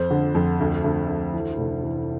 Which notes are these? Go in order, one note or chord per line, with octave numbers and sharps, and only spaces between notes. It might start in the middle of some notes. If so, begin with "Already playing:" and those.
Already playing: F2 C5
D3
F2
D2
D2
D2
E3
F1
E3